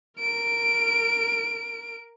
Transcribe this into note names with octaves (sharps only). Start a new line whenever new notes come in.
A#4 D7